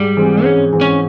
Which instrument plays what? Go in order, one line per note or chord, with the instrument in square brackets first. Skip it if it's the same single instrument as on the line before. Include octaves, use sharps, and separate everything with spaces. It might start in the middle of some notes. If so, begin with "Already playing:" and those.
Already playing: [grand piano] G#2 [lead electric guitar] G3
[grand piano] E3 G#3 C4
[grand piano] G#2 [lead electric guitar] C#4
[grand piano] E3 G#3 C4
[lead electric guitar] C#4